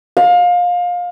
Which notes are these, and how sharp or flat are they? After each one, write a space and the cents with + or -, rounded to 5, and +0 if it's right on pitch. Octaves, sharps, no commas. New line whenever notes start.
F5 +25